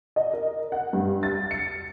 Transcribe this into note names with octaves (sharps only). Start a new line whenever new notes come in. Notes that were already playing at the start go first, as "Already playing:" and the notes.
D#5
A#4
F#5
G2
A6
C#7